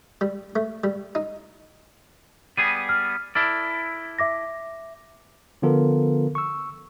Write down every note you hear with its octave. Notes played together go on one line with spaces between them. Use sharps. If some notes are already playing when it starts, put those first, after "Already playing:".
G3
A3
G3
D#4
G3 B3 G#4 D#7
F6
E4 A4 D5 F6
E5 D6 A#6
D3 F3 B3 F4 A4 A#4
C#6 E6